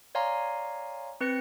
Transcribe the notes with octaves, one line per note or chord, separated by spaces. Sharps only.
C#5 D5 F5 G#5 A#5 C6
C4 B4 F#6 A#6 C#7